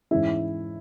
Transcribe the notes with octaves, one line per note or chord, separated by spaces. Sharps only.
G#2 E3 G#3 C#4 E4